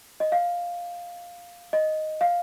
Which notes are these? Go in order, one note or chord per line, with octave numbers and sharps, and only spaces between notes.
D#5
F5
D#5
F5